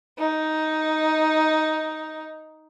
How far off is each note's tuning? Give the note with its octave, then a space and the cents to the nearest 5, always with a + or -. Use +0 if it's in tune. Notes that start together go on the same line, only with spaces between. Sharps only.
D#4 +5